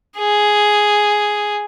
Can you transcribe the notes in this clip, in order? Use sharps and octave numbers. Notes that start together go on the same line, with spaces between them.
G#4